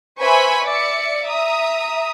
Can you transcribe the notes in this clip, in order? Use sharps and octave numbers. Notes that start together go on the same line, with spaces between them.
B4 C5 E5 G#5 B5 C#6
D5 E5 C#7
E5 A#5 D#6